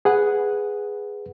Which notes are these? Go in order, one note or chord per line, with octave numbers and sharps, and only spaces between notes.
G#4 B4 F#5